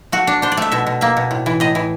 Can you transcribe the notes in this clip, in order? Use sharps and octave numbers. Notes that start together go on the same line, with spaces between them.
A3 F#4
D4
D4 C5
D5
A3 E5
B2 E5
B2
A#3 E5
B2
A2
E3
A2 D#5
E3